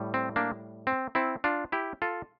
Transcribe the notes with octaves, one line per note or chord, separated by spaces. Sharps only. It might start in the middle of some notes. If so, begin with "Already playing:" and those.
Already playing: A2 G3
C4
A#3 D4
C4
C4 E4
D4 F4
E4 G4
F4 A4